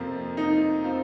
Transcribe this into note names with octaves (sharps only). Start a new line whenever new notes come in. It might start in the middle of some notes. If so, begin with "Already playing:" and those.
Already playing: F2 C3 F3 A#3
D#4
F3 C4 F4 C5